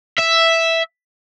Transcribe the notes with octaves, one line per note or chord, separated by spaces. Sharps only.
E5